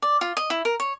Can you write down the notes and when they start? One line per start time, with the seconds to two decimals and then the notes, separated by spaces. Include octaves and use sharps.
0.02 D5
0.21 F4
0.37 D#5
0.50 E4
0.65 A#4
0.80 C#5